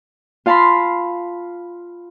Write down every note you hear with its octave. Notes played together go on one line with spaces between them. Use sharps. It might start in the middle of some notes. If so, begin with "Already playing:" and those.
F4 F5 A5 B5 C6